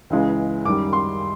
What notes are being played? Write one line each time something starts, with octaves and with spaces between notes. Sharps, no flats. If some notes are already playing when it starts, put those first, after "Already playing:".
C#2 C#3 E3 G#3
F#2 D#3 G3 D6
C6